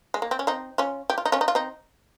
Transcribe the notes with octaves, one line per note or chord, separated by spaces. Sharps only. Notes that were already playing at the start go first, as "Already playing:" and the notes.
G#3
A#3
C4
C#4
C4 D#4
C#4 F4
G4
F4
D#4
C#4 F4
D#4
F4
C4 D#4